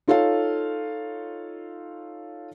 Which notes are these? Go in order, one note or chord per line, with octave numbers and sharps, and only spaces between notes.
D#4 F4 A4 C#5 F5